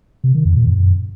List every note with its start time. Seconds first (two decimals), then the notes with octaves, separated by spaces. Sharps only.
0.24 C3
0.34 D#3
0.45 F2
0.56 A#2
0.67 F#2